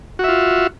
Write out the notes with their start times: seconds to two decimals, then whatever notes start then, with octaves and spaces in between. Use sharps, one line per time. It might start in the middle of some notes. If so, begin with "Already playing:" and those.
0.19 F#4
0.24 E5
0.28 F4